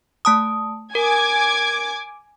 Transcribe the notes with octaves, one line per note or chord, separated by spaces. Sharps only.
A3 A5 D#6
A#4 G#5 D6 G#6